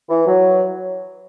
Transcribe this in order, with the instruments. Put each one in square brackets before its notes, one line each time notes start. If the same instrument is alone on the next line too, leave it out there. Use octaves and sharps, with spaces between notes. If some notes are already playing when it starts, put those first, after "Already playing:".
[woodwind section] E3
F#3